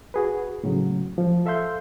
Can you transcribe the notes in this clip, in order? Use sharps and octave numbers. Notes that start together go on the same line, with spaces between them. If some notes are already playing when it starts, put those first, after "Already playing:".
F#4 G#4 B4
A2 C#3 F#3
F3
A4 E5 F5 C6 G6